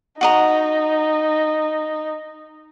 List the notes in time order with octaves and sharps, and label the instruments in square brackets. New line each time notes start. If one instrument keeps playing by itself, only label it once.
[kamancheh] D#4 [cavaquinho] F#4 D#5 A#5